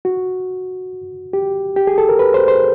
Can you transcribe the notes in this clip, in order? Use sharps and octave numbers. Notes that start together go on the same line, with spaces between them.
F#4
G4
G4
G#4
A4
A#4
B4
C5
C5